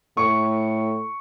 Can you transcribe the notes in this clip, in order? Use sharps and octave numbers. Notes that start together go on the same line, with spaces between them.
A2 C#6